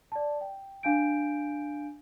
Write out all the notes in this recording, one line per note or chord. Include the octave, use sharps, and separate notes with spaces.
D5 A5
G5
D4 F5 G#5 G6 D7